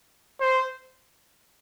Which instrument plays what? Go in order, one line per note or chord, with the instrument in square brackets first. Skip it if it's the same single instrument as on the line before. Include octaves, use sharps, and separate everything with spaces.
[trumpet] C5